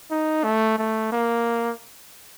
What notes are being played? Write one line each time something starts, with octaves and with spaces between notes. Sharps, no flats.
D#4
A3
A3
A#3